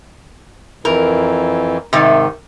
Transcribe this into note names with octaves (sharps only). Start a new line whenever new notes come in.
F2 E3 A#4
G#2 C3 D#3